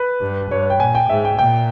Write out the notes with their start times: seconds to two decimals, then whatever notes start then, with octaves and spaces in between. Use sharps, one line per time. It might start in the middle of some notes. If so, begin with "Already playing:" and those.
Already playing: B4
0.21 G2
0.50 G2 C#5
0.70 G5
0.80 A#2 G#5
0.95 G5
1.10 G#2 E5
1.25 G5
1.38 A#2 G5